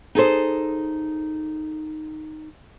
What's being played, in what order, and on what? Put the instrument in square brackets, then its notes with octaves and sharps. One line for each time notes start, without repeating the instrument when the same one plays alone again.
[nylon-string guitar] D#4 G#4 A4 C5